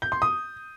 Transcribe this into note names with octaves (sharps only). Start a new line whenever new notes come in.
G6
C6
D#6